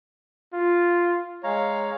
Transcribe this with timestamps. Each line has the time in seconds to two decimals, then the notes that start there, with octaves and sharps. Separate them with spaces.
0.53 F4
1.44 G#3 C#5 F5 A#5